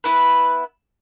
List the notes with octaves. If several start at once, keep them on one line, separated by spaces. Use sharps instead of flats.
B3 E4 B4